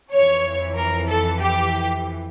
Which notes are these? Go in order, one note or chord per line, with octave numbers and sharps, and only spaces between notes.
F2 E3 C#5
A#4
A4
G4